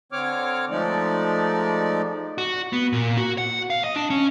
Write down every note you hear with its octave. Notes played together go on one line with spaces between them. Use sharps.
D3 C4 C#5 D6 F6
F3 G#3 A3 D#4 D5
F#4
B3
A#2
F#4
F#5
F5
D#5
D4
C#4